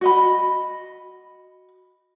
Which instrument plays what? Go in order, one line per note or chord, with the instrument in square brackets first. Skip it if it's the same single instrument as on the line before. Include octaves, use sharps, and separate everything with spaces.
[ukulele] F#4 D#5 B5